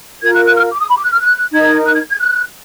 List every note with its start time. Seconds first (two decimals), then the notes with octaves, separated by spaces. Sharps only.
0.23 F4 A#4 G#6
0.34 F#6
0.45 F#6
0.56 F6
0.71 D6
0.80 D#6
0.89 B5
0.97 D6
1.04 F#6
1.12 F6
1.21 F#6
1.53 D#4 A#4 G#6
1.85 F#6
1.94 G#6
2.10 G#6
2.19 F#6